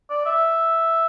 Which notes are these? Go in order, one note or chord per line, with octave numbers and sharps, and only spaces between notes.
D5
E5